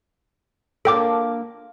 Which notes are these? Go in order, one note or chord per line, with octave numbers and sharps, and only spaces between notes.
A#3 D4 F4 A4 G5 D6